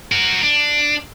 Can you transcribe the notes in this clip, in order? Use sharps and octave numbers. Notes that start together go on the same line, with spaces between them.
F#4 A#4
D4